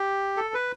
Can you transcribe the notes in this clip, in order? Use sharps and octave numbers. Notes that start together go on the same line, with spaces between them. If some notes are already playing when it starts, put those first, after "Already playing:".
Already playing: G4
A4
B4